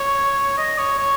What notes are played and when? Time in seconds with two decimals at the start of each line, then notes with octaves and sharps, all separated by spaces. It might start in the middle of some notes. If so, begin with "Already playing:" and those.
Already playing: C#5
0.57 D#5
0.78 C#5
0.98 C#5